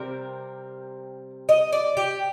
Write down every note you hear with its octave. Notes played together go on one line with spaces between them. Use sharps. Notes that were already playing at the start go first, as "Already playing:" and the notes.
Already playing: C3 G3 C4 A#4
D#5
D5
G4